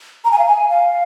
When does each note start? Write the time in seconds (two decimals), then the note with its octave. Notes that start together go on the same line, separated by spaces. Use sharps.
0.25 A#5
0.32 G#5
0.39 F5
0.46 G#5
0.69 F5